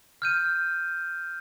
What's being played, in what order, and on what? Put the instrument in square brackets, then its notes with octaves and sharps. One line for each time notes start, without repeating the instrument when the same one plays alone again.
[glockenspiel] F6 G6 D#7